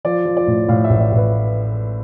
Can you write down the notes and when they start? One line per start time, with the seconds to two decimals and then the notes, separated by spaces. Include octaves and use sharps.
0.05 F3 D5
0.25 F3
0.37 D5
0.47 A2
0.68 A2 F5
0.84 E5
0.90 A1
1.00 D5
1.12 A1 B4